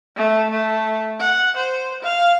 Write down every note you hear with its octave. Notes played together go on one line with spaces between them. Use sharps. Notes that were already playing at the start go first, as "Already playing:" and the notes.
A3
A3
F#5
C5
F5